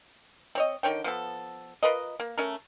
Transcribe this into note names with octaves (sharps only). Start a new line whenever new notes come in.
C4 C#5 D#5
D3 D#3 C#5 G5
F3 B3 A4
F4 A#4 B4 D#5
A#3
A3 C#4 A#4